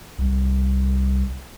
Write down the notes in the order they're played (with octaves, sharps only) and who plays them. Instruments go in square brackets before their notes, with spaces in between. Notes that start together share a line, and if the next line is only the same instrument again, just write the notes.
[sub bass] C2